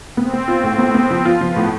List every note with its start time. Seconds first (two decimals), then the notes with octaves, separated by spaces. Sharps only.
0.17 B3 C4
0.33 B3
0.48 F4
0.63 A2
0.78 B3
0.94 B3
1.11 F3
1.25 F4
1.40 F3 B3
1.56 A2